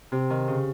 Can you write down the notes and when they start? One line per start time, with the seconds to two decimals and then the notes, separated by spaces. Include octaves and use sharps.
0.12 C3
0.30 D#3
0.48 C#3